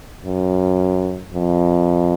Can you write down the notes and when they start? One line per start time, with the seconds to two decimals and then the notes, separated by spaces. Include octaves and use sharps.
0.25 F#2
1.34 F2